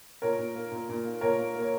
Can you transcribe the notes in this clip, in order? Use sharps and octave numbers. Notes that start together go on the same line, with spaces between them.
A#2 A#4 C#5
A#2
A#3
A#2
A#2
A#3
A#2 A#4 C#5
A#3
A#3
C#5